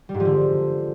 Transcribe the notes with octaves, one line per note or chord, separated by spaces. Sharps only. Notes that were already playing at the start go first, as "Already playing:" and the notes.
G3
G#2
F3
D3